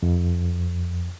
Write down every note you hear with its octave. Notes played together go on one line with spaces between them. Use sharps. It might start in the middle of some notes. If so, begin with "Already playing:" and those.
F2